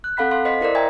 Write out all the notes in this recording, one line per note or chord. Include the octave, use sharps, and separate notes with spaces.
F#6
C4 A4 F5 F#5 B5 B6
A4 F5 C6
C5 D#5 C6 B6
E4 A#4 C5 D5
D#5 E5 G5 G#5 A#5 G#6